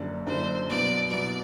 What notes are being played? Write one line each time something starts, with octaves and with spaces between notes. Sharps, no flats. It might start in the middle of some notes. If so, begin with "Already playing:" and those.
Already playing: F#1 F#2 D3 G3
F#1 F#2 D3 G3 C5
C2 B2 F#3 D5
C2 B2 F#3 D5